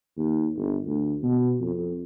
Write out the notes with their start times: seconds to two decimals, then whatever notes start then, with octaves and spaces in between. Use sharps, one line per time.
0.17 D#2
0.57 G1
0.87 D2
1.23 B2
1.61 F2